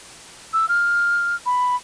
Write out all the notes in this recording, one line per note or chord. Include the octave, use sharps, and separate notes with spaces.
E6
F6
B5